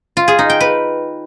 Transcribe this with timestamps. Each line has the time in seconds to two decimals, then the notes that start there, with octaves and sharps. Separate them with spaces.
0.17 F4
0.28 G#4
0.39 D#4
0.50 G5
0.61 B4